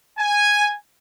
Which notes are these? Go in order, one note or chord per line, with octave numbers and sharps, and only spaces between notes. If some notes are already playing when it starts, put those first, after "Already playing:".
G#5